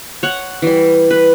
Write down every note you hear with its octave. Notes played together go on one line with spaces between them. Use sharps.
C#5 F#5
E3 G3
B4